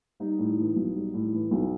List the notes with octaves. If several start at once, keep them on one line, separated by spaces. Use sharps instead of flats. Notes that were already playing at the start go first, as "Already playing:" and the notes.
G3 D#4
A2
E3
B1
G3
A2
E3
B1